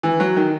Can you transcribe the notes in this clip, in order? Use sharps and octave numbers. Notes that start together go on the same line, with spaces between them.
E3
F#3
D#3